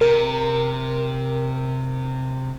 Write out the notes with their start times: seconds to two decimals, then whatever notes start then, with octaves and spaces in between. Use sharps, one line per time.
0.01 C3 A#4